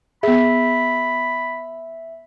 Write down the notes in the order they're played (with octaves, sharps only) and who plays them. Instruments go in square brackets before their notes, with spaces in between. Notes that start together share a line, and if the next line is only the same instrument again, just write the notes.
[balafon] B3 G#4 [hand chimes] E5 [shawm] B5